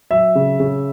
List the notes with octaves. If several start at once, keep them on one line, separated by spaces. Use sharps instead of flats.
F#3 E5
C#3
C#3